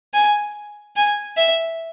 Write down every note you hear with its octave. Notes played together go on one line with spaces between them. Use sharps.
G#5
G#5
E5